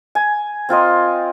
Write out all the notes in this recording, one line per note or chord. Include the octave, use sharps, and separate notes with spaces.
G#5
C4 F4 A#4 D#5